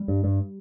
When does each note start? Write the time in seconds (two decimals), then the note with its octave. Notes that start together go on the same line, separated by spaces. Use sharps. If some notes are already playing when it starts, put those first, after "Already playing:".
Already playing: G3
0.08 G2
0.24 G2